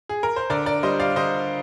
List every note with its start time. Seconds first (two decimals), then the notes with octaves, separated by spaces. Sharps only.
0.09 G#4
0.23 A#4
0.36 C5
0.50 D3 A#4 D5
0.66 A#4 D5
0.83 G3 C5 D#5
1.00 D5 F5
1.16 D3 C5 D#5